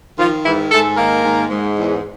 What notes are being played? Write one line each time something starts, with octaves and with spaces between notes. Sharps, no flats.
D#3 F3 F4
G#2 E3 E4
G#2 A3 A4
D#3 A#3 A#4
G#2
G#2
E2